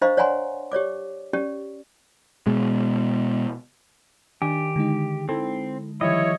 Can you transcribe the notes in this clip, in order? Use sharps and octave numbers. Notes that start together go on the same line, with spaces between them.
D4 C5 D#5 F5 A#5 C#6
C#5 D5 F#5 G#5 A#5 C6
G4 C#5 D5 D6
C#4 G4 D5
B2 G#3
D#3 D4 G4 G#5
D3 G#3 D#4
C4 E4 A4
D#3 F3 G3 E4 C#5 D#5